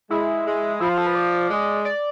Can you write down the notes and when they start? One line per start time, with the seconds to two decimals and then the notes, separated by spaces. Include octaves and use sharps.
0.10 G#3 E4
0.46 G#3
0.80 F3 E4
0.89 F4
0.98 A4
1.07 B4
1.15 D5
1.50 G#3
1.85 D5